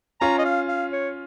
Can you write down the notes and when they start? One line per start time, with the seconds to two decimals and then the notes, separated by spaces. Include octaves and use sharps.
0.21 C#4 F4 A#5
0.39 D#5
0.45 F5
0.69 F5
0.93 C#5